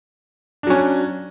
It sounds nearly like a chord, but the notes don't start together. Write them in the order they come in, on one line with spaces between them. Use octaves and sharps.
D4 F#3 C#4